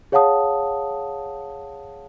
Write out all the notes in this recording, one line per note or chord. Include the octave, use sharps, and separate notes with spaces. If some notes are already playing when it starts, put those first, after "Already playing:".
G#4 C#5 F5 F#5 A5 D#6